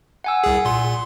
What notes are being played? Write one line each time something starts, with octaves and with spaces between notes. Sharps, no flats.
F#5 G#5 E6
C2 G#4
A#2 C6